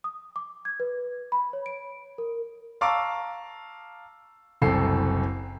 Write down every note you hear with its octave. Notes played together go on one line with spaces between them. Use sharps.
D#6
D6
G#6
B4
B5
C#5
D7
A#4
F5 A5 A#5 C#6 D6 E6
F#1 C2 C4 A4 C7